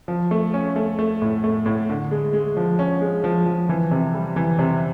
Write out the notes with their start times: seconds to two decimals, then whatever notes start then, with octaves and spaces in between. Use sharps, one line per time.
0.08 F3
0.31 A3
0.54 C#4
0.76 A3
0.99 A3
1.22 A2
1.44 A3
1.66 A2
1.89 D3
2.11 G#3
2.33 G#3
2.56 F3
2.79 C#4
3.01 G#3
3.24 F3
3.46 F3
3.69 E3
3.91 C3
4.15 G3
4.36 E3
4.59 C3